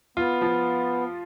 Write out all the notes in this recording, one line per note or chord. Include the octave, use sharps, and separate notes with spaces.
B3 F4
F3